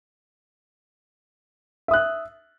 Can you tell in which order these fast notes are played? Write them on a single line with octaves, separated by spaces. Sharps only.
E5 D#6 F#6